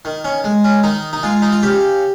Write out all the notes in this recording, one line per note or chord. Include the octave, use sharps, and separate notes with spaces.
D#3
C#4
G#3
C#4
D#3 D#4
D#4
G#3 F4
D#4
F4
C#3 G4